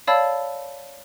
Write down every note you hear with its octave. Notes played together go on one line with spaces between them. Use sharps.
C#5 D5 F5 A5 B5 E6